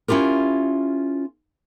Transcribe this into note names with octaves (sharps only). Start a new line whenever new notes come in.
C#4 E4 F4 G4 A#4